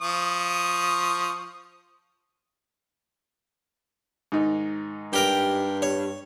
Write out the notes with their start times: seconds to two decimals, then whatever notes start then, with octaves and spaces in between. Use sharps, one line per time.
0.01 F3 C#6 D#6
4.32 G#2 D#3 D#4
5.13 G2 G4 A#4 G5
5.82 C#5